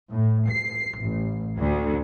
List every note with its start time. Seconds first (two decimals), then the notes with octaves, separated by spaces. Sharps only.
0.12 A2
0.49 C7
1.00 A1
1.58 D2